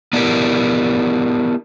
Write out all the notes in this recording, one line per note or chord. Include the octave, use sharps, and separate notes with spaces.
B3 D4 E4 G4 A4 A#4